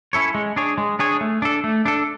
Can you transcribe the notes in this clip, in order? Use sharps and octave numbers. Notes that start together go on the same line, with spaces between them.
C#4 E4 A4 C#5
G#3
D4 G#4 C#5
G#3
D4 G#4 C#5
A3
D4 A4
A3
D4 A4